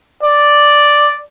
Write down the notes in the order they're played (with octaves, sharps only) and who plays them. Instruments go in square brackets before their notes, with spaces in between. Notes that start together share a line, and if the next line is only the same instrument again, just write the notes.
[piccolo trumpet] D5